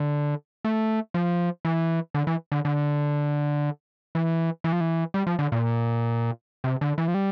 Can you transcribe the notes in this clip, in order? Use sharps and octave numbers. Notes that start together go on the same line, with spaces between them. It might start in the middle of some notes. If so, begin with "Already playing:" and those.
Already playing: D3
A3
F3
E3
D3
E3
D3
D3
E3
E3
F3
E3
G3
F3
D3
A#2
C3
D3
E3
F3
G3